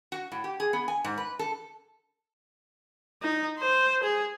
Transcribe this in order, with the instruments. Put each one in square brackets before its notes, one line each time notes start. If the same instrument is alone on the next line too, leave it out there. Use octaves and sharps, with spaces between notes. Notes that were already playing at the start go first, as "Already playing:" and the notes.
[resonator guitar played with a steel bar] F#4
A2
G4
G#4
B3
G#5
G#2
B4
A4
[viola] D#4
C5
G#4